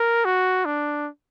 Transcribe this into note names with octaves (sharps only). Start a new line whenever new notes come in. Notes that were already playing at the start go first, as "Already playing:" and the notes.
Already playing: A#4
F#4
D4